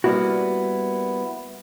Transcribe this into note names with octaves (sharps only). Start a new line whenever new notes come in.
G3 A#3 B3 E4 F#4